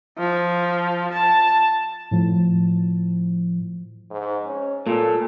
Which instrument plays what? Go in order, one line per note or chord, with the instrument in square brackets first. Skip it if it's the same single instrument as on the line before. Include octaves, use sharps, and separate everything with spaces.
[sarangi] F3
A5
[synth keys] A2 F3
[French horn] G#2
C#4
[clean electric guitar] A#2 [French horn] A4